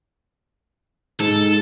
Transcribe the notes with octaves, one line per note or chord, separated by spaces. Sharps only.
G#2 A4